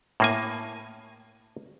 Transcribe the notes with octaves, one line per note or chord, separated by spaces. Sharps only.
A2 A#3 G#5